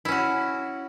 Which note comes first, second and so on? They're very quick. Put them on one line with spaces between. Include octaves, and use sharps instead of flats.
E4 C#4 F#4